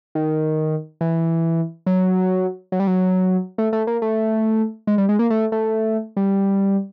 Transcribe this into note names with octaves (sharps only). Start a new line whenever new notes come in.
D#3
E3
F#3
F#3
G3
F#3
A3
A3
A#3
A3
G#3
G3
G#3
A#3
A3
A3
G3